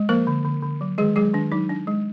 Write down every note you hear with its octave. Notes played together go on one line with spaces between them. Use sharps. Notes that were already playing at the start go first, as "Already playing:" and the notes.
Already playing: G#3
F3 A#3 A#4
D3
D3
D3
F#3
D#3 G#3 G#4
F#3 G#3 G#4
D#3 D4
F#3 D#4
D4
G#3